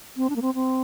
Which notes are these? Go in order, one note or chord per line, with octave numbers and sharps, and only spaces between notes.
C4
D4
A#3
C4
C4